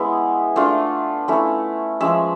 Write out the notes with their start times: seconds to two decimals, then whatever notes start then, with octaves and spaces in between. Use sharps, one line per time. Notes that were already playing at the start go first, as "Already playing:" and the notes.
Already playing: G#3 B3 C#4 E4
0.56 A3 D4 F4
1.28 A3 C#4 E4
2.01 F3 G#3 C#4 E5